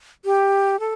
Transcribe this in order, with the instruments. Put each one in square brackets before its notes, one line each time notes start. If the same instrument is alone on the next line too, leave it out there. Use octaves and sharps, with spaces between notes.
[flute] G4
A4